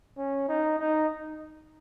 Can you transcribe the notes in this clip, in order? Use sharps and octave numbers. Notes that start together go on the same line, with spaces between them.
C#4
D#4
D#4